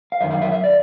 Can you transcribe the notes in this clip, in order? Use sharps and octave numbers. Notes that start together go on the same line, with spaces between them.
F5
F#2 D#3 E5
F5
E5
E5
D5